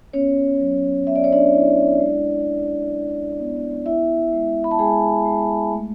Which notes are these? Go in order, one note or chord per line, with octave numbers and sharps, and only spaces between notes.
B3 C#4 C#5
F#3
B3 E5
D5
C#5
D4 D5
E4
G#3
G#3
E4
B3
E4 E5
G#3
B5
A5
G#3 G#4 G#5
G#3
A3